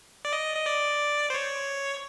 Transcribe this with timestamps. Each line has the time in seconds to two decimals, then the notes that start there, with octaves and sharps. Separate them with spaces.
0.25 D5
0.33 D#5
0.56 D#5
0.66 D5
1.30 C5
1.34 C#5